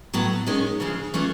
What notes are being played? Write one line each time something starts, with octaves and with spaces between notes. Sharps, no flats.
A2 F#3 B3
D#3 G#3 C#4
D2 C#3 F3 G#3
E3 A3 C#4 F4